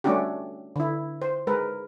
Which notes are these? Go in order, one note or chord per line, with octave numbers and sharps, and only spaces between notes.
G3 A3 C#4 D4 F#4 G4
D3 E4
C5
G#3 A#4 B4